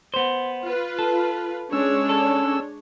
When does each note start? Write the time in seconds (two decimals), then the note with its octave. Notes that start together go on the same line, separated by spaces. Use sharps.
0.14 B3 C5
0.64 F4 B4
0.99 A4
1.73 G#3 C#4 D4 C#5 E6
2.09 A4